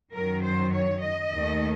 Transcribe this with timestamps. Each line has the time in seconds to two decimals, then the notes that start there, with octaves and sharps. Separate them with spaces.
0.13 F#2 D#3 F#3 A#4
0.43 C5
0.73 C#5
1.03 D#5
1.33 D#2 D#3 A3